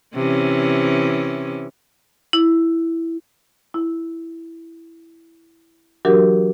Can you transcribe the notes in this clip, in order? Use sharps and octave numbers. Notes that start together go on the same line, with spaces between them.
C3 E3 C#4
E4
E4
E3 F#3 D4 F#4 G4 A#4